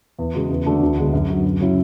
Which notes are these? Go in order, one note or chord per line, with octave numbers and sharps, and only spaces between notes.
E2
C#3 G#3 B3 F#4
E2
D3 A3 D4 F#4
D2
D3 G#3 B3
F#2
D3 F#3
F#2
C#3 F#3 C#4 E4